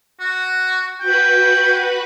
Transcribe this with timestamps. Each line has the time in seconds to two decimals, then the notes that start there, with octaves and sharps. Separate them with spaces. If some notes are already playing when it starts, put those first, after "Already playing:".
0.20 F#4
1.01 F#4 B4 G5 B5